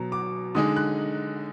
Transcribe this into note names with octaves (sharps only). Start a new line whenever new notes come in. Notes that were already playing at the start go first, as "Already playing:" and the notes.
Already playing: B2 F#3 B3 A#5
D6
D3 G#3 D#4 D#6
F#6